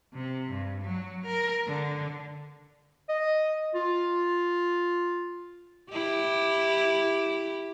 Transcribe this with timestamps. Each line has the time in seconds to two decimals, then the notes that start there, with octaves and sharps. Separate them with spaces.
0.14 C3
0.50 G2
0.82 F#3
1.26 A#4
1.67 D3
3.09 D#5
3.75 F4
5.91 E4 G4